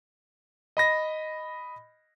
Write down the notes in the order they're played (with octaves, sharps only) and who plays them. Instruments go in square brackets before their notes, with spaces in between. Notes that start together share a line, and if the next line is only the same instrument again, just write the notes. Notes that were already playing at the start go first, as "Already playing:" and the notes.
[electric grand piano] D#5 B5 A#6